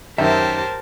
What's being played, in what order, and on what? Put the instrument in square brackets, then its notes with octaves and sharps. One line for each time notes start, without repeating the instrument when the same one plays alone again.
[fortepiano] F#2 D#3 [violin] G4 C5 [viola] A#4 A5 [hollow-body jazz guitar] E5